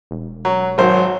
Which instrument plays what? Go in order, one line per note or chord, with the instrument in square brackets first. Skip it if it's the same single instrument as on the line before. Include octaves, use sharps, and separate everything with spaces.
[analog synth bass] E1
[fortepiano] F#3
[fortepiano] G#1 C5 [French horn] F#3